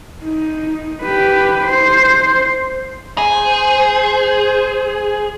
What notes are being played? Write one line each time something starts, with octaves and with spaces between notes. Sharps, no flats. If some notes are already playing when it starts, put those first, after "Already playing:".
D#4
G4 B4
C5
G#4 C5